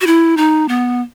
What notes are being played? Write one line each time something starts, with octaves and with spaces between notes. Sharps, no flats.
F#4
E4
D#4
B3